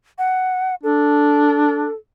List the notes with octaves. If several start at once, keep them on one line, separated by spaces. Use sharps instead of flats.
F#5
D4 A4